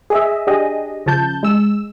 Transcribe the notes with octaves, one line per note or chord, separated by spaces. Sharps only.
G#4 D#5 E5
D4 G4 G#4 D#5
C#3 F3 A5 G6
G#3 E6